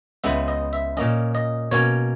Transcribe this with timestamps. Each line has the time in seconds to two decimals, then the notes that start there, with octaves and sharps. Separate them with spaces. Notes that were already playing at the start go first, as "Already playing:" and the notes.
0.24 C#2 C#3 G#3 B3 E5
0.48 D#5
0.73 E5
0.97 A#2 A#3 C#4 D#5
1.35 D#5
1.71 B2 A#3 C#4 C#5